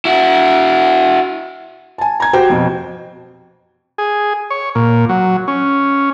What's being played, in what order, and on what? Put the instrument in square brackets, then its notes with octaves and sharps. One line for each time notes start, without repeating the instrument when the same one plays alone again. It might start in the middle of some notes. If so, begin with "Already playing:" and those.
[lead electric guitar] E4 F#4
[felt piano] G#5 A5
A#5 G#6
F#4 G4 C5 G5
F2 B2
[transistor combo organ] G#4
C#5
A#2
F#3
C#4